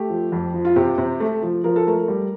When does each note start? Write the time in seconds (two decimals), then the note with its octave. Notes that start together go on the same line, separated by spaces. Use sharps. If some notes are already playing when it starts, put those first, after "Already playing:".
Already playing: A3 G4
0.09 F3
0.32 F2
0.54 F3
0.65 F4
0.76 C3 G4
0.98 C3
1.20 A3
1.42 F3
1.64 F3 A#4
1.76 A4
1.87 A3 A#4
2.08 G3